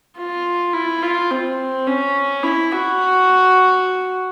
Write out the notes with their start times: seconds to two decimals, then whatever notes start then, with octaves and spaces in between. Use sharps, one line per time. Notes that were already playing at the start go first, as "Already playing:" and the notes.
0.18 F4
0.73 E4
1.03 F4
1.31 C4
1.87 C#4
2.43 E4
2.72 F#4